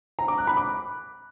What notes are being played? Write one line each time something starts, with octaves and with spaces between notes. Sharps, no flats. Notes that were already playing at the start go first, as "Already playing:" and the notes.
A#5
D6
F#6
B5
D6